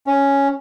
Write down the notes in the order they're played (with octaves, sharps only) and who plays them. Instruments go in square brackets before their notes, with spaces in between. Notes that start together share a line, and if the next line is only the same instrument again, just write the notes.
[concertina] C#4